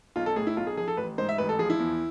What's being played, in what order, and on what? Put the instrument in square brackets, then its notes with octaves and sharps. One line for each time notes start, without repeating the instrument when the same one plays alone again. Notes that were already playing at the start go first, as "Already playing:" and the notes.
[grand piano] B1 F4
A4
A2 G#4
E4
B1 F4
G#4
F3 G#4
A4
A1 B4
G#2 C5
E5
A1 B4
A4
F3 G#4
E4
E2